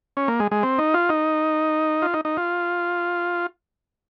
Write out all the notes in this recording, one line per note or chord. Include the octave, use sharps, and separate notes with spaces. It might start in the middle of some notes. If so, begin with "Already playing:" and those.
C#4
A#3
G#3
G#3
C4
D#4
F4
D#4
F4
D#4
D#4
F4